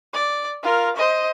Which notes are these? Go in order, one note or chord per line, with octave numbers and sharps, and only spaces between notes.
D5
F4 A#4
C5 D#5